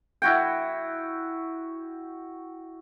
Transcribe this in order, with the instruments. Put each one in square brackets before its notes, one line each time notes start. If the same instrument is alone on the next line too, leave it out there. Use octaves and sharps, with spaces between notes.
[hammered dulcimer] E4 F#4 G5